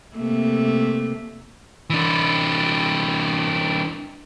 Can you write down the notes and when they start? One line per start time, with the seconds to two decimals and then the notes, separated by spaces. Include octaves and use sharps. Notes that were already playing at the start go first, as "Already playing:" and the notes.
0.15 C3 A3 A#3
1.90 E3 D4